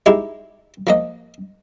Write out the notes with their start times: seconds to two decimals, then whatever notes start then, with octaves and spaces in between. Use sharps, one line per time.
0.06 G#3 D#4 E4 G4
0.87 F3 A#3 D#5